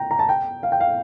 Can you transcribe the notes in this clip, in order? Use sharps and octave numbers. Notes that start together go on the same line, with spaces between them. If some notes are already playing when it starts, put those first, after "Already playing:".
Already playing: G5 A#5
A#5
A5
G5
F5
G5
F5